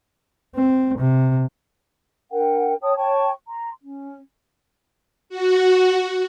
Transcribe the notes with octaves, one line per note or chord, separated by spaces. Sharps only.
C4
C3
D4 A#4 F#5 G5
C#5 G5 A5 D#6
C#5 G5 A5 C#6
A#5 C6
C#4
F#4